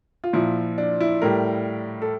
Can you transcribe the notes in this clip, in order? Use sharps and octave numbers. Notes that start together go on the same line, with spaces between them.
F4
A#2 F3 E4
D4
E4
A2 G3 A#4
A4